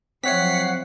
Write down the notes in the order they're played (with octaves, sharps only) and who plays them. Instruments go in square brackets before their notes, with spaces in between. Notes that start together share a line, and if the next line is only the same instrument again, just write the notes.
[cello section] F3 F#3 [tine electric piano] C4 C#5 E5 [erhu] F#5 [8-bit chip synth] B6 C7